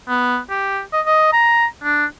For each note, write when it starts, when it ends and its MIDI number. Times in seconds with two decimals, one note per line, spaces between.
0.08 0.38 59
0.50 0.80 67
0.92 1.01 75
1.06 1.29 75
1.33 1.66 82
1.83 2.06 62